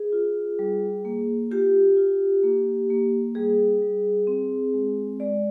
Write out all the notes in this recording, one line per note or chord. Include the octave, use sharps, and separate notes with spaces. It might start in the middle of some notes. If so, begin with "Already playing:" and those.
Already playing: G#4
F4
G3
A#3
F4 G4
F4
A#3
A#3
G3 G#4
G3
C4
G#3
G#3 D5